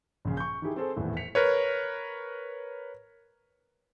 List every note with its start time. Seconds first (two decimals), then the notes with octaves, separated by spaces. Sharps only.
0.25 A#1 C#3
0.37 C#6 G6
0.62 D#3 E4 G4 G#4
0.76 C4 G#4 A4 C5
0.96 D#1 E2 A2
1.17 B6 C#7 F7
1.35 A#4 B4 C#5